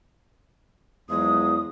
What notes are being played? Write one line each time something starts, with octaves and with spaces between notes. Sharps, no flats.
E2 F3 F#3 G#3 D#6